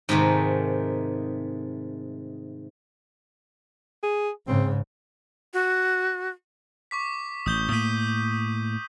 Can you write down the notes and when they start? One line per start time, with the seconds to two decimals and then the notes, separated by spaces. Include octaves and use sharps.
0.09 G#2 C3 D#3 A3
4.03 G#4
4.47 G#2 C#3 C4
5.54 F#4
6.91 C#6 D6 B6
7.46 A1 D#6 G6 G7
7.71 A2 A#3 D#6 B6 D#7